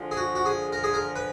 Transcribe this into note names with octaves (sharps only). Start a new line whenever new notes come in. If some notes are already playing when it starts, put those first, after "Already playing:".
Already playing: D3 F3 G#3
G#4
F#4
F#4
G#4
A#4
G#4
A#4
B4